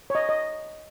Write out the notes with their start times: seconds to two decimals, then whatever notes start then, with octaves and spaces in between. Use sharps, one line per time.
0.10 C#5
0.15 D#5
0.29 D#5